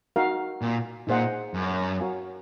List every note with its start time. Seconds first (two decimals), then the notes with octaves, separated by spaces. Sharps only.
0.16 D#4 F#4 A#4 F5
0.62 A#2
1.07 A#2 D#4 G#4 C5 D#5 F#5
1.54 F#2
2.00 F#4 A#4 C#5 F5 G#5